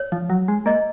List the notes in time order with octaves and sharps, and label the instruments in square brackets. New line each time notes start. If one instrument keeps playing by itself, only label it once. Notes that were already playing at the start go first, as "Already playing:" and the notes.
Already playing: [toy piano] C#5
[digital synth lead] F3
F#3
G#3
[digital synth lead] A#3 [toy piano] D#5